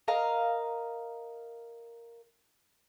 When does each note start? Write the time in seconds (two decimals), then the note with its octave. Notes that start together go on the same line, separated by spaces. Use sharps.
0.08 A#4 D#5 F5 A#5